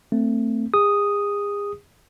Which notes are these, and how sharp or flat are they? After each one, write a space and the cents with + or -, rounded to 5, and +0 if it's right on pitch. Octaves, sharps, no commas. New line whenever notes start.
A3 +25 C4 +0
G#4 -35 D#6 +0